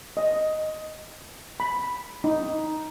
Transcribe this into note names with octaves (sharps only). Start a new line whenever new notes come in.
D#5
B5
D#4